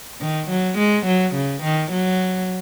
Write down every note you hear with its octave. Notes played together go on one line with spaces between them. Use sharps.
D#3
F#3
G#3
F#3
C#3
D#3
F#3